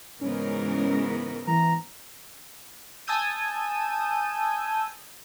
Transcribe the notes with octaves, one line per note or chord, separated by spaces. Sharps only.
G#2 C#3 E3 G#3 B3 C#4 A#4
E3 A#5
G#5 A5 D#6 E6 G6 D#7